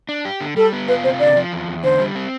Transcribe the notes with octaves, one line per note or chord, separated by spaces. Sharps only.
D4
G4
D3
G3 A4
B3
F4 B4
C3 C5
D3 D5
F3
E2
E2
D3 C5
G3
C4